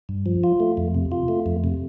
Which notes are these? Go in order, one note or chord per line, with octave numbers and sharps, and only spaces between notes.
G2
F3
F4
A3
F2
C3
F4
A3
F2
C3